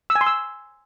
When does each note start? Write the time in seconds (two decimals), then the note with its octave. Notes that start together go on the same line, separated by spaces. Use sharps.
0.10 E6
0.15 G#5
0.21 C6
0.26 E6